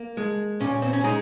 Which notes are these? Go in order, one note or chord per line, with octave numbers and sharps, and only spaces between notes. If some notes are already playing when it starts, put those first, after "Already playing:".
Already playing: A#3
G#3
A#2 C#4
C4
C#4
G#3 D#4